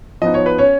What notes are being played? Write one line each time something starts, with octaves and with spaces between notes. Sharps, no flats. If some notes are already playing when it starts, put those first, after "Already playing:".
F3 B3 D#4 D#5
C#5
B4
C#4 C#5